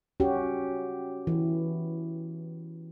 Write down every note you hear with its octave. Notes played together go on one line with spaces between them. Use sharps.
C#4 F#4 G4
E3